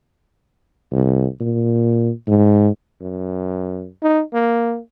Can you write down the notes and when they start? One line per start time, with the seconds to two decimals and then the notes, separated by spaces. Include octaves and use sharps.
0.92 C2
1.40 A#2
2.27 G#2
3.01 F#2
4.02 D#4
4.33 A#3